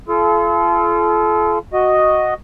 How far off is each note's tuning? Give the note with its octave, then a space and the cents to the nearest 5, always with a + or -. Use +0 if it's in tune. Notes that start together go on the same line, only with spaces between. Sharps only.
F4 -35 A4 -40
F#4 +0 D#5 +0